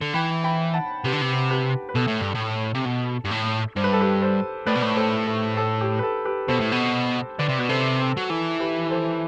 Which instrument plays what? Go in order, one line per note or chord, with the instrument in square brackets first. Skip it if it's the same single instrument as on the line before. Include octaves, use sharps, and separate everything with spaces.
[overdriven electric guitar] D3
[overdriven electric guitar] E3 [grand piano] G5 B5
[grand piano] G5 B5
F#5 A5
[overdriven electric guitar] C3 [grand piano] G4 B4
[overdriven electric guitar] D3
C3
[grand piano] G4 B4
B4
[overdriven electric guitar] B2 [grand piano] A4
[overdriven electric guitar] A2
G2
A2
C3
B2
G2
A2
[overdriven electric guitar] G2 [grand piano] C5
[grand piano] B4
A4
G4 B4
A4 C5
[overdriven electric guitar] A2 [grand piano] B4 D5
[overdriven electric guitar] B2
A2
[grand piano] A4 C5
A4
A4
G4
B4
A4
G4 B4
[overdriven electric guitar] B2 [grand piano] A4 C5
[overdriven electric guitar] A2
B2
[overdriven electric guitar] D3 [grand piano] B4 D5
[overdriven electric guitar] C3
[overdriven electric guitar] B2 [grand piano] B4
[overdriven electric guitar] C3 [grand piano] A4 C5
[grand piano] A4 C5
[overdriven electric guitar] F#3
[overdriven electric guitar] E3 [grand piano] A4
[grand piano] G4 B4
A4 C5